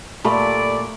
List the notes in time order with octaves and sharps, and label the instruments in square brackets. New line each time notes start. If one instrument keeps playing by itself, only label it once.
[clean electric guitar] A#2 [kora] A3 [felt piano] G4 B5 [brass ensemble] A4 D5